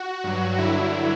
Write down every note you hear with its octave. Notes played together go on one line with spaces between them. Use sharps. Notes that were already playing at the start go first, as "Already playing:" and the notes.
Already playing: F#4
G2 F#3
G2 D3 F#3 E4